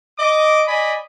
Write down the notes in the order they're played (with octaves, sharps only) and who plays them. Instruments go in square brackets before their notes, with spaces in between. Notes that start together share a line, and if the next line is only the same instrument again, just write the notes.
[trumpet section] D#5 D6
D5 D#5 G#5 B5